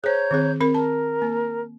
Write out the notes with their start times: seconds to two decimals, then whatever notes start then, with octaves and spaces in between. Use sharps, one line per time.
0.04 G#4 C5 C#5 A#5 G6
0.31 D#3 C4 G#4
0.60 C4 A#4 B5
0.75 A#4 A5
1.22 A#3